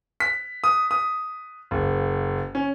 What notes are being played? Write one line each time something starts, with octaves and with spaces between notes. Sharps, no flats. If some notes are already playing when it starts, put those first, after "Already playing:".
B6
D#6
D#6
F#1
C#4